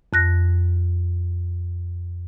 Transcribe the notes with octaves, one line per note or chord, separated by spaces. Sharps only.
F2 F#6 A#6